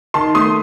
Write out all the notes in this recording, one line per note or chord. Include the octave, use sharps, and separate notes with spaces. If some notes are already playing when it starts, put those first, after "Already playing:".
D#3 A5 C6
A3 C6 D#6